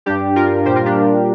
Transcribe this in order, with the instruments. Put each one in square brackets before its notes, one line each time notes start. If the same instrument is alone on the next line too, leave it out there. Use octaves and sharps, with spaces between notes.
[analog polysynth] G2 G3 D4 G4
F4 A#4
A#2 G3 G4 C5
F4 A#4
D4 G4